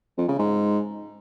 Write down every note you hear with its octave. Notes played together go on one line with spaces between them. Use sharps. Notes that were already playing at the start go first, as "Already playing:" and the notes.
F2
C#3
G#2